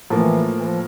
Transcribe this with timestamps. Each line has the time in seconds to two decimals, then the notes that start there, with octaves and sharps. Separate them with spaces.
0.10 A2 E3 F3 A#3
0.59 E3
0.70 F3